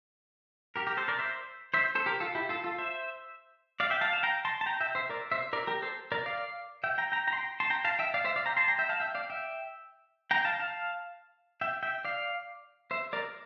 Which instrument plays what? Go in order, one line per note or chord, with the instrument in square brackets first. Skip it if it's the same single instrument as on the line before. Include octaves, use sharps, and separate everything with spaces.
[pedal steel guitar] G4 A#4
G4 A#4
A4 C5
A#4 D5
C5 E5
C5 E5
A4 C5
G4 A#4
F4 A4
E4 G4
F4 A4
F4 A4
C5 E5
D5 F5
E5 G5
F5 A5
F5 A5
G5 A#5
A5 C6
A5
G5 A#5
E5 G5
C5 E5
A#4 D5
C5 E5
A#4 D5
G4 A#4
A4 C5
A#4 D5
D5 F5
E5 G5
G5 A#5
G5 A#5
G5 A#5
C6
G5 A#5
A5 C6
G5 A#5
F5 A5
E5 G5
D5 F5
C5 E5
D5 F5
G5 A#5
A5 C6
G5 A#5
E5 G5
F5 A5
E5 G5
D5 F5
E5 G5
G5 A#5
F5 A5
F5 A5
E5 G5
E5 G5
D5 F5
C5 E5
A#4 D5